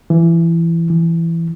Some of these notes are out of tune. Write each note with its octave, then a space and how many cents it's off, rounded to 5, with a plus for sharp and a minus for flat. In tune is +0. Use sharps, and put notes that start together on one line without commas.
E3 +20
E3 +15